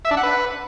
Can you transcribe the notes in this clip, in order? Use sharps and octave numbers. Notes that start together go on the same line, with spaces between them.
E5
D4
F#5
B4